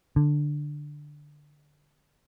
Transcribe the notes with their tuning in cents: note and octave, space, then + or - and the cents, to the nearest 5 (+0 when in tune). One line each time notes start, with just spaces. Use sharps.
D3 +5